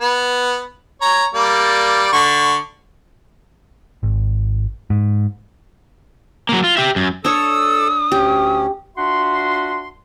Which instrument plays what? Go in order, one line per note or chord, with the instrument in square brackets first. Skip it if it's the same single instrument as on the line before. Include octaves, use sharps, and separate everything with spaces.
[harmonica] B3
C#5 A#5
G3 A#3 D5
D3 C#6
[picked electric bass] G#1
G#2
[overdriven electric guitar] F#3 A#3
F4
G4 E5
F#2
[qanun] D4 C#5 [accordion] A4 E6 [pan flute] D#6
[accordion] D2 C#4 [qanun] G4
[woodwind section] D4 F4 F#4 E5 F#5 C6